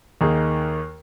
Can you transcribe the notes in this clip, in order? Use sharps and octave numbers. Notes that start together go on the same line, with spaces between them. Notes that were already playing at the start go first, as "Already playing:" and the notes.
D#2 D#3 A#3 D#4 G#4